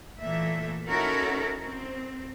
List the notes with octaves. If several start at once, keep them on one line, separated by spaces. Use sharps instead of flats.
A#2 E3 A3 A#3 E5
C#4 D#4 E4 F#4 A4 A#4
C4